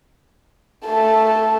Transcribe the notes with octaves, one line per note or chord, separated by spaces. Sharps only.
A3 A5